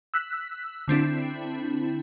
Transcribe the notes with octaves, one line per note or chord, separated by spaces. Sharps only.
E6 F#6 B6
D3 C4 D4 E4